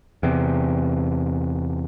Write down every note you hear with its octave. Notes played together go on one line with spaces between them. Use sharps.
E2 C3